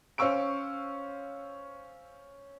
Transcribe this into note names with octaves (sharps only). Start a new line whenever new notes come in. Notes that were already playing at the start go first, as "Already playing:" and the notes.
C#4 C5 F5 C#6 E6 D7